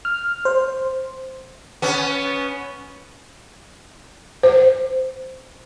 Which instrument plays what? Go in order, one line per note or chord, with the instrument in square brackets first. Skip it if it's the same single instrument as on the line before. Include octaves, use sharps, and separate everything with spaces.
[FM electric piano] F6
C5
[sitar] B3 C#4
[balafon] C5